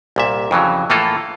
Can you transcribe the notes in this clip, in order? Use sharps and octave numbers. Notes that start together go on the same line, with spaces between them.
C2 A#2 E5
F2 C#3 E3 F#3
A2 E3 A#3 F4 A4